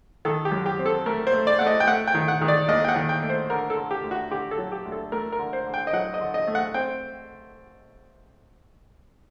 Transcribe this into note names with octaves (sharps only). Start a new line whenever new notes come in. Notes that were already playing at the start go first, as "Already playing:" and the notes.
D#3 A4
G4
F#2
G4
C4
A4
A3 A#4
C5
A3
D5
A3 F#5
D#5
G5
A3 F#5
G5
D#3
F#5
D#3
D5
D#2 D#5
G5
F#5
D#3
G5
A3
C5
D3 A#4
A4
D3
G4
D2
F#4
D3 G4
A4
F#3
G4
D2
A4
A3 A#4
A#4
D3
C5
D3
G5
D#5
F#3 F#5
D#5
D3
D#5
A3
F#5
C4 G5